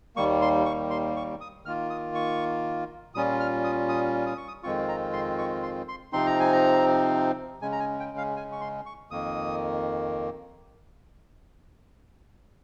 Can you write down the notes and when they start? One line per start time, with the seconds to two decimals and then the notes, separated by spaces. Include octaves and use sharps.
0.16 D#2 D#3 G3 A#3 C#6
0.42 C6
0.65 C#6
0.90 C6
1.16 C#6
1.41 D#6
1.65 D#3 A#3 F4 F6
1.90 D#6
2.15 C#6
3.15 A#2 G3 C#4 F4 D#6
3.40 F6
3.64 D#6
3.89 D#6
4.26 D#6
4.37 C#6
4.48 D#6
4.63 F2 D#3 G#3 C4 F4 C#6
4.89 A#5
5.13 C6
5.38 C#6
5.63 C6
5.88 C6
6.13 C3 F3 C4 D#4 C6
6.26 A#5
6.40 G#5
6.53 A#5
7.62 C#3 G#3 C#4 G#5
7.72 A#5
7.80 G#5
7.99 G5
8.17 F5
8.36 G#5
8.52 C#6
8.61 C6
8.86 C#6
9.11 F2 D#3 A#3 D#6